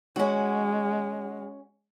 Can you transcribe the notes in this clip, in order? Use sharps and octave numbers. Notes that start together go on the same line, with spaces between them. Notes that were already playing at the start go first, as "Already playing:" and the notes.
G#3 C#4 F#4